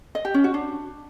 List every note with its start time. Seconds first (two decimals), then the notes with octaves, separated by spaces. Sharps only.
0.15 D#5
0.25 G4
0.34 C#4
0.44 F#4
0.54 D4